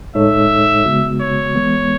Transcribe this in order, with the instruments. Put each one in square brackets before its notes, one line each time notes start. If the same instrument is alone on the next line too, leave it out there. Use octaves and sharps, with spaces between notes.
[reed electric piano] A2 G#3 D#4 A4 C#5 [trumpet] E5
[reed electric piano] C#3 G#3 B3 F#4
[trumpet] C#5
[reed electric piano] E3 G#3 B3